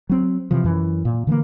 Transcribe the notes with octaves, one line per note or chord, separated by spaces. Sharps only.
F#3 C4
C3 E3 F3
F#2 E3
A#2
D3 E3 G3 A#3